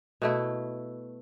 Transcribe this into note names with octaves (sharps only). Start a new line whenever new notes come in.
B2 A3 E4